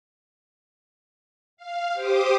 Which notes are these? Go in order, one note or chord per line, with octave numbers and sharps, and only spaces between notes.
F5
G4 C5 D6 D#6